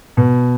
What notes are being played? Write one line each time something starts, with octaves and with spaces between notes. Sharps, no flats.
B2